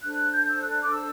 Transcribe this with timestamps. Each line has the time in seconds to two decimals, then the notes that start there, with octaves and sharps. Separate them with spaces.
0.02 D4 A4 C5 F#6
0.32 G6
0.50 E6
0.62 F#6
0.83 D6
0.91 E6